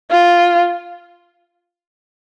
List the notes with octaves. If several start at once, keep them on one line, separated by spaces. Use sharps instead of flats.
F4